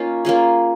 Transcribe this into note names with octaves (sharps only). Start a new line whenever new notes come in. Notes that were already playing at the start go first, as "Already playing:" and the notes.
Already playing: A#3 C#4 D#4 F4
A#3 C#4 F4 G#4